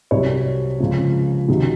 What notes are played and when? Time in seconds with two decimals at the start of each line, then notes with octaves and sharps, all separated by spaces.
0.11 C2 C3 F#3 C#5
0.80 C#2 C#3 F3
1.48 C#2 C3 D#3 F#3